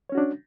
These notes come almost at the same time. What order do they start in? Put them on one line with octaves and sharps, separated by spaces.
C#5 C#4 F#4 D4